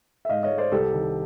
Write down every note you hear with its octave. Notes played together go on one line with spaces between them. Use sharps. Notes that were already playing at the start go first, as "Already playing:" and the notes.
E5
G#2 D#5 F5
C#5 D#5
G#3
C5 D5
C2 G4 A4
D#3